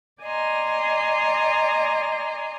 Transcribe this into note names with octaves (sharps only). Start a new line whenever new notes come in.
D5 D#5 G#5 A#5 C6